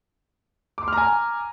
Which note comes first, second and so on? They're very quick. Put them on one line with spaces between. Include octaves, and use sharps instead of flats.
D6 C6 F6 A#5 G#5